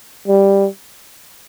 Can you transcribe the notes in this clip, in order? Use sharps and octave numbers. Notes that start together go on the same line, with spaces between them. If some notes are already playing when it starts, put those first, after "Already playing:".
G3